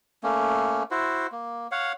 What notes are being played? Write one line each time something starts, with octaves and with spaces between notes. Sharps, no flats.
A3 A#3 C#4
E4 F#4 C5
A#3
C#5 F5 F#5